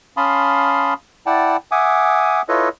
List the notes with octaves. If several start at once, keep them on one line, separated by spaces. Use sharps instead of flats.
C#4 F5 A5 B5 C6 D#6
E4 D5 F#5 G5 A5
E5 F#5 G#5 D6 D#6
E4 F4 A4 B4 C#5 D#5